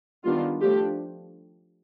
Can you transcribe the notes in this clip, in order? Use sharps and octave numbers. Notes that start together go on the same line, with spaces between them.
D#3 G3 B3 D4 F4
F3 A3 D4 G4